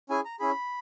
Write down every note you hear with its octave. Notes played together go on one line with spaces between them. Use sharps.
C#4 E4 G#4 G#5
A#5
C#4 E4 G#4 B5